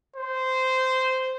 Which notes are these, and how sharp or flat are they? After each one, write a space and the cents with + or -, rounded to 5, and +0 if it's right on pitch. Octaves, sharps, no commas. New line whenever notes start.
C5 -10